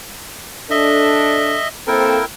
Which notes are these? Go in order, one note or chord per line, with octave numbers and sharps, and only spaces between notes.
D4 A4 D#5 E5
A#3 C4 E4 A4 A#4 G5